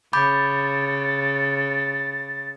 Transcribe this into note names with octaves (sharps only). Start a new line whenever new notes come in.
C#3 B5 D6 G6 A6